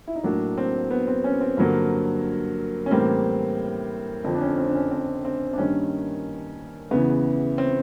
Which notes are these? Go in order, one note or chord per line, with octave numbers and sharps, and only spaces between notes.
E4
D#4
A2 F#3 A#3 D4
C4
B3
C4
C#4
C4
G2 D3 F#3 A#3
C#4
A2 E3 G3 A#3 C4
F2 D3 F3 C4
D4
C#4
C4
D4
C#4
C4
C4
D4
G2 D#3 G3 A#3 C#4
E2 C#3 E3 B3
C4